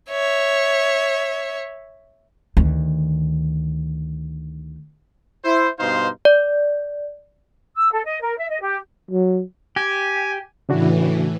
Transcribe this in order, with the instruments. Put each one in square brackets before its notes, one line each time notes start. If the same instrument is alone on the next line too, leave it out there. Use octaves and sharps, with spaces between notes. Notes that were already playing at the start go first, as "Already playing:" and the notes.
[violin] C#5 E5
[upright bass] D2 D#3
[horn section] E4 C5
G2 B2 D#4 C5 F5 C6
[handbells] D5
[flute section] E6
A4
D#5
A#4
E5
D#5
G4
[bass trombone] F#3
[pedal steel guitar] G4 [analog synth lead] G#5
[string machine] A2 E3 [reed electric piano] C#3 D4 F#4